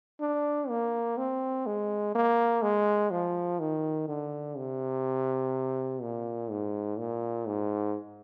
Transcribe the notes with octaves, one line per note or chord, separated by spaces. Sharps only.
D4
A#3
C4
G#3
A#3
G#3
F3
D#3
D3
C3
A#2
G#2
A#2
G#2